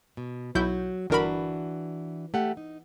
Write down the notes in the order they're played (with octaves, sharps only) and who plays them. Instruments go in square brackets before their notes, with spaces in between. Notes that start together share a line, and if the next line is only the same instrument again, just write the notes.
[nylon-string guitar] B2
[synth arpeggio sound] B1 E4 G6 [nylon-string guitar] F#3 F#4
[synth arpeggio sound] G1 A#4 B5 [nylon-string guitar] E3 D4 F#4
[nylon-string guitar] A3 G4 F#5
D#4